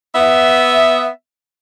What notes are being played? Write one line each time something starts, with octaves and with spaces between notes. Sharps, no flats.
B3 E5